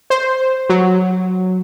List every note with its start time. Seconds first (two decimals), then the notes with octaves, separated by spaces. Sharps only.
0.10 C5
0.69 F#3